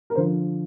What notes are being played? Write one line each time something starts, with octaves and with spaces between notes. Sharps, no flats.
A#4
D3 F3 C5